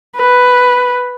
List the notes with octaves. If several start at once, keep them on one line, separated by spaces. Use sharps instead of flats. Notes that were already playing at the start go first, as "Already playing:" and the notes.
B4